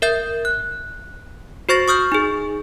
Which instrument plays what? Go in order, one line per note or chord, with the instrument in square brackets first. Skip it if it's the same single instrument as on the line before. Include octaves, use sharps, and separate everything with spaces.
[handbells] A#4 E5 G6
F#6
F#4 C5 C#6 A6 A#6
C#6 D#6 F6 G6
D#4 G#4